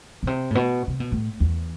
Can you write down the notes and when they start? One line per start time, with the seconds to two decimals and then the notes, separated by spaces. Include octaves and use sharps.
0.23 B2
0.27 C3
0.50 A2
0.55 B2
0.87 C3
1.00 B2
1.12 A2
1.40 E2